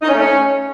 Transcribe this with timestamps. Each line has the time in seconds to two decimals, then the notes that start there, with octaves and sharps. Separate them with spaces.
0.02 D#4
0.08 C#4
0.14 A3
0.19 C#4